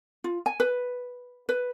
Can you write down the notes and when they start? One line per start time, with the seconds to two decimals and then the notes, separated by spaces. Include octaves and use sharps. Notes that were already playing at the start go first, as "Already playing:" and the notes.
0.24 F4
0.46 G#5
0.60 B4
1.49 B4